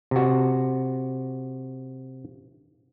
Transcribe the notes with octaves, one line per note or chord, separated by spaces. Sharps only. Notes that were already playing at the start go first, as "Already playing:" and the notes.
C3 F#4